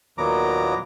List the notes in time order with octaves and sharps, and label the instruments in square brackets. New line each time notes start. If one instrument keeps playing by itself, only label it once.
[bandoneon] D#2 A#2 F#3 B3 A#5 D6